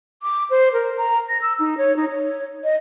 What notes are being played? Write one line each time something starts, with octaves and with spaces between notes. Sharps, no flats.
D6
C5
A#4
A#5
A#6
E6
D#4
C#5
D#4
C#5
D#5